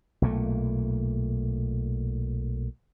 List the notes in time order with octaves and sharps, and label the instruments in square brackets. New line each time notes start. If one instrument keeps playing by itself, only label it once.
[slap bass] B1 A#2 A3